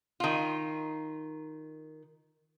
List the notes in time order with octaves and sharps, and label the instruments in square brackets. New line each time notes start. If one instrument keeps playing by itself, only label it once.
[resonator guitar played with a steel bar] D#3 F4